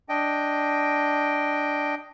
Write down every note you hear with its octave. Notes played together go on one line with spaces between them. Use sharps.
D4 D#5 G5